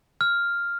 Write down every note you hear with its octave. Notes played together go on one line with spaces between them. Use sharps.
F6